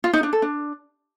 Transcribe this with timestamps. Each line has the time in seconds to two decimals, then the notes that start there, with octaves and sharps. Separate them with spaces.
0.04 F4
0.13 D#4
0.23 D4
0.33 A4
0.42 D4